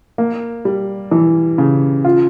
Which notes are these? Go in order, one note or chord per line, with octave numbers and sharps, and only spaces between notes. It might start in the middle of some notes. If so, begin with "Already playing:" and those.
A#3
G3
E3
C#3
F4